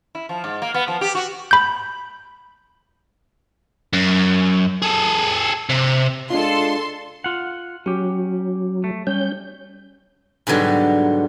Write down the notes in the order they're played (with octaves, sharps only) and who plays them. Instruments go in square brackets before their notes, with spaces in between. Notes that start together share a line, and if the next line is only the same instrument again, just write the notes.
[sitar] E4
F3
G#2
A#3
B3
F3
G4
F#4
[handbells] B5 G6
[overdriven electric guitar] F#2
G#4 A4
C3
[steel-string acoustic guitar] G#3 D4 F4 [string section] A4 C6
[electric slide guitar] F4 F#5
[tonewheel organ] F#3 [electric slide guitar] C#4 G4
[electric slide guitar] A3
[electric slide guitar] G3 [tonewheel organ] C#4 G6
[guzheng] G#2 B2 D3 F#3 G3